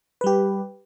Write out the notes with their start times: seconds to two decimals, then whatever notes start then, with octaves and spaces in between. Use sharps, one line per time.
0.21 B4
0.24 G3
0.27 G4